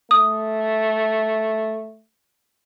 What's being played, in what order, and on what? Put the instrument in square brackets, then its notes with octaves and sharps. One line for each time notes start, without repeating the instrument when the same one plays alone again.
[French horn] A3 [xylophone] D#6